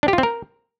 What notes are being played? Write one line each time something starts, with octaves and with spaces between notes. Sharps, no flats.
D4
G4
F4
C4
A#4